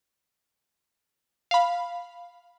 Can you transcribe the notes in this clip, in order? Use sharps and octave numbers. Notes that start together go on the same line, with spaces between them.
F5 B5